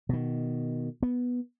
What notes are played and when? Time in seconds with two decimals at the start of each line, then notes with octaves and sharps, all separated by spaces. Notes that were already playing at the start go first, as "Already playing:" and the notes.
0.09 B2 D#3
1.03 B3